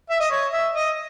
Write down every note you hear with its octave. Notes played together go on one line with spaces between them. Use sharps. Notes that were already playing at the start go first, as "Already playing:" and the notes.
E5
D#5
C#5
E5
D#5